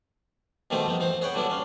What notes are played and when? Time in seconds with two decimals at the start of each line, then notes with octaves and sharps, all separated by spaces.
0.70 B2 D#3 G3 A3 C4 D#4
0.86 F2 B3 D#4
1.00 E3 C4 C5
1.21 G#4 B4 C#5 F#5 G5
1.34 D3 F#3 G3 B3 D4 E4
1.50 C#4 D4 F5